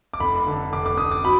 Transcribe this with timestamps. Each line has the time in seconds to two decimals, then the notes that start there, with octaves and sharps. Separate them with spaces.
0.14 D6
0.20 F1 B5
0.47 D3
0.73 F1 D6
0.86 D6
0.98 F1 D#6
1.11 D6
1.25 F#3 B5